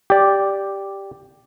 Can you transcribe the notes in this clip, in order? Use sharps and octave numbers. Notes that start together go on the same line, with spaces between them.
G4 D5